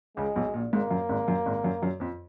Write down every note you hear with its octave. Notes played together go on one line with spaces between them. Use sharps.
C#2 C#3 G#3
B1 B2
A#1 A#2
G#1 G#2 A#3
F#2
G#1 G#2
F#2
G#1 G#2
F#2 F#3
F#2 F#3
F2 F3